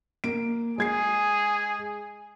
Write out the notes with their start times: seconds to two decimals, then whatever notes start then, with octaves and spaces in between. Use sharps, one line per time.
0.24 A#3 D7
0.78 G#3 G#4 G#6 C7